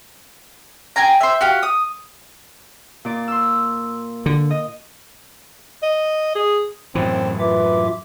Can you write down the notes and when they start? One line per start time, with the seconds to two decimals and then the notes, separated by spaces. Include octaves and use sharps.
0.96 G#4 G5 G#5 A#5
1.21 C5 E5
1.41 F#4 G4 F5
1.63 D#6
3.05 A#2 D5
3.28 C6 E6
4.26 D3
4.50 D#5
5.83 D#5
6.35 G#4
6.95 F#2 A2 E3 C4
7.40 F4 B4 E5 D6